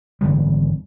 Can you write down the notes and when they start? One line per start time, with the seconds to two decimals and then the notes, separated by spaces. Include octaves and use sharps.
0.21 G#1 E2 D3 G3